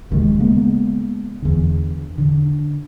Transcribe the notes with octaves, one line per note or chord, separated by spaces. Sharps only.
D1 D#2 C#3 G#3
C#3 G#3 A#3 B3
E2 D3
D3